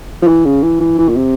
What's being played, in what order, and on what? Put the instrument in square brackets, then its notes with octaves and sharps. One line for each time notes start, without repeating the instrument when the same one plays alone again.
[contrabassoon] F3
E3
C#3
E3
E3
E3
A#2
C3